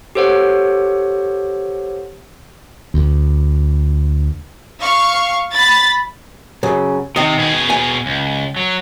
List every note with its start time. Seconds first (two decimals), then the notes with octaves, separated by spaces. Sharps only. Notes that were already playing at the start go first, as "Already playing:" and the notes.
0.15 G4 A4 C5 C#5 F#5
2.94 D2
4.81 F5 C#6
5.53 B5 A6
6.63 F#2 C#3
7.16 C3 D#3 D#5
7.38 B2 G#4
7.70 G#5
8.06 C#2
8.56 F#3